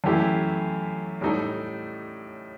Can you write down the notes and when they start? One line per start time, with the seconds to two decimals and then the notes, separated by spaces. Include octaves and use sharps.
0.04 F#2 E3 A3 E4 G4
1.21 A2 G3 D#4 A4